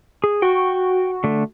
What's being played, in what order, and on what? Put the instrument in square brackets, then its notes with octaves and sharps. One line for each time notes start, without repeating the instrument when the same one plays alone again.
[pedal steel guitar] G#4
[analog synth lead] F#4 [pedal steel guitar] G5 C#6
[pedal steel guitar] D3 A3